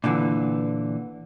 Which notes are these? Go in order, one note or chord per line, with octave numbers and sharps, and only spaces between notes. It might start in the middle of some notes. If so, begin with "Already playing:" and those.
A#2 D3 E3